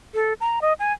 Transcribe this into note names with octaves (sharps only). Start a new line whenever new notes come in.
A4
A#5
D#5
G#5